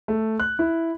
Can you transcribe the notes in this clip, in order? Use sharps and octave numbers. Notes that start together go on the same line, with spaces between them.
A3
F#6
E4